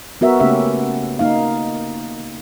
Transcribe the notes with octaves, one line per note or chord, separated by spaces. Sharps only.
B3 F#4 A#4 E5
C#3 A3 A#3 C#4 G4 E5
A#3 D#4 F5